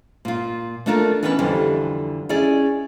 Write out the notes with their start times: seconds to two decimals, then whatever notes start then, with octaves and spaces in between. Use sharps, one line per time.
0.25 A#2 F4
0.86 A3 A#3 D4 F4 A4 A#4
1.23 E3 B3 C#4 D4 E4 B4
1.39 F2 D3 E3 G3 D4
2.29 C#4 E4 G#4 D5